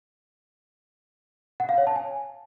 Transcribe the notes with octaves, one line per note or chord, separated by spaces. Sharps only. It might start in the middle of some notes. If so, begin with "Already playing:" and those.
F#5
F5
C#5
A5
G#5